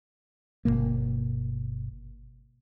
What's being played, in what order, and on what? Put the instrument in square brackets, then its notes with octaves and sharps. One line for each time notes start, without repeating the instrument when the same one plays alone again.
[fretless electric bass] G1 G#2 B2 A#3